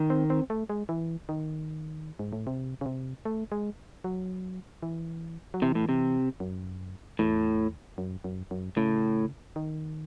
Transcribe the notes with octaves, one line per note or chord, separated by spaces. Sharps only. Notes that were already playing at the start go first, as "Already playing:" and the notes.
Already playing: D#3
C4
C4
A3
G#3
E3
D#3
G#2
A2
C3
C#3
C3
A3
G#3
F#3
E3
F#3
C3 E3
A2
C3
F#2
E2 A2
F#2
F#2
F#2
A2 C#3
D#3